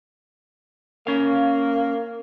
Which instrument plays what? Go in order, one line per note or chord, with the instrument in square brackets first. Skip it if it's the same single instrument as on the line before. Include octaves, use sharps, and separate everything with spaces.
[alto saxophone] A#3 [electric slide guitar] C#4 F5